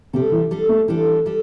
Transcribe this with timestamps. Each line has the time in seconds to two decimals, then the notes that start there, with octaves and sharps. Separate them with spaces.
0.13 C3 G3 D4 A4
0.32 E3
0.51 G3 D4 A4
0.69 A3
0.88 E3 G3 D4 A4
1.26 G3 D4 A4